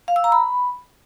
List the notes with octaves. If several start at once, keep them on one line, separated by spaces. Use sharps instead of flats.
F5
E6
A#5
B5